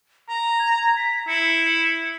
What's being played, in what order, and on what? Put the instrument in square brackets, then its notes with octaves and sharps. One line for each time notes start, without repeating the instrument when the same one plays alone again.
[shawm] A#5 [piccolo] A#6
[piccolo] G#6
B6
[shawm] E4 [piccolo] C#7